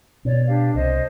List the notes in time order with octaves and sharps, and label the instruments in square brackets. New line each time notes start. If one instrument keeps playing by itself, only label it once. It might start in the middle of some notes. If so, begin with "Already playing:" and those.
[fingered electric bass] B2 [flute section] C#5 D5
[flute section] D4 G4 F5
[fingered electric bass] C2 [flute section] C5 D#5